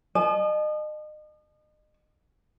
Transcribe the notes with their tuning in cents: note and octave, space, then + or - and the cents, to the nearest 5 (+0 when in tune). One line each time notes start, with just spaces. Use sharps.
D#5 -35 A5 -40